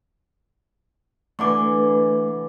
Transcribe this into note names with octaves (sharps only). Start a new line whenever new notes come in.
D3 E3 A3 B4 G#5 C#6 D6